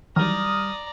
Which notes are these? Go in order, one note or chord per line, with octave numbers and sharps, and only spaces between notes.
D#3 E3 F#3 G3 D5 A#5 D#6 F6